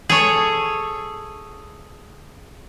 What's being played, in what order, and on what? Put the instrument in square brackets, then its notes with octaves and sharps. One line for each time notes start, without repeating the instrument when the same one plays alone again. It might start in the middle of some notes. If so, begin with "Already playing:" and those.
[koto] G#4 A4 C#5